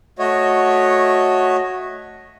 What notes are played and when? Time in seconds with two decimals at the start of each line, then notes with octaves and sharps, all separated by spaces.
0.19 A3 F#4 C#5 D#5